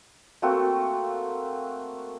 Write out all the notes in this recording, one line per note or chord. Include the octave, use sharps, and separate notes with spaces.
A3 A#3 C4 F#4